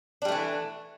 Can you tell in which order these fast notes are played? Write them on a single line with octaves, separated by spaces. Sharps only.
D4 G3 A3 E3